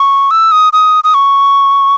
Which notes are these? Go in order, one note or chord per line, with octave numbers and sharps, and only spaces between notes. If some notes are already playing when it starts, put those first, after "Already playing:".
Already playing: C#6
E6
D#6
D#6
D#6
C#6